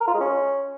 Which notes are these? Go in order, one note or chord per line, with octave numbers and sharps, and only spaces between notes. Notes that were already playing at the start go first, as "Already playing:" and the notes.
A#4
F4
G#3
C#4